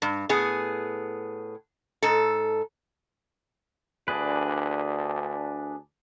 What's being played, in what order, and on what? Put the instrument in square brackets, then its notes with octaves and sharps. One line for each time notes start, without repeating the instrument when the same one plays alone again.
[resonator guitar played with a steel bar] G2
A2 B3 G#4
G#2 A4
[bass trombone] D2 [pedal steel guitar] D4 G#4 B4